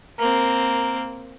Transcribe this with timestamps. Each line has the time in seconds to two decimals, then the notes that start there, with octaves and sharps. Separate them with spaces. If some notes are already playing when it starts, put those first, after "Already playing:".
0.19 A#3 C4 A#4